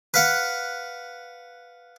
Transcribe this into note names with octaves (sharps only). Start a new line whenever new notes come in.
B4 F5 F#5